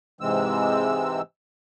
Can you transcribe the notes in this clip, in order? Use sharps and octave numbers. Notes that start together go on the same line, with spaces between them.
G#2 C3 E3 G#3 C4 E6